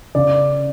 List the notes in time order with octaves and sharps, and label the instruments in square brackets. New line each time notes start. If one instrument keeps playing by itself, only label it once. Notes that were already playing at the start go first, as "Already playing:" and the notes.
[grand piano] C#3 D5